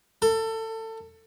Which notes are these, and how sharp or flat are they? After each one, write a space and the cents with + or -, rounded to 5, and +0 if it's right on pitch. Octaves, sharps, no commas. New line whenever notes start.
A4 +25